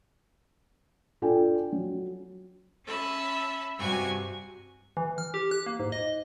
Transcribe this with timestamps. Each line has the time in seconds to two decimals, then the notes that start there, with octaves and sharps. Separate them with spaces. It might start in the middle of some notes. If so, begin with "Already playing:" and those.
1.22 D4 F4 A4 G5 G#5
1.72 F#3
2.85 C#4 E5 A5 B5
3.77 G2 C3 F#4 G#5 C#6
4.97 E3
5.18 F6
5.34 G4
5.51 F#6
5.66 A#3
5.80 G#2
5.92 D#5